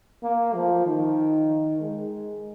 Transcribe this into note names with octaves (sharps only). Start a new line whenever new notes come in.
A#3
F3
D#3
G#3